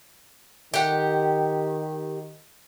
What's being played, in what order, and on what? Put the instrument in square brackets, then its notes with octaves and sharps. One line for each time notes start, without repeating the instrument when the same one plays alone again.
[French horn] D#3 [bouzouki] G4 F#5